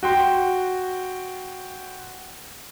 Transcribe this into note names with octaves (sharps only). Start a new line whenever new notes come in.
F#4 G5 C6